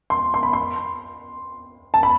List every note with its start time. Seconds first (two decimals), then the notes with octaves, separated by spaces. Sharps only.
0.10 C6
0.34 C6
0.43 B5
0.53 C6
1.94 A5
2.03 B5